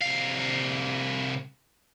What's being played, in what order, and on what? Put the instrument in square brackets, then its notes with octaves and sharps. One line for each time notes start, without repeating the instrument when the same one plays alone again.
[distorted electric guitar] C2 F5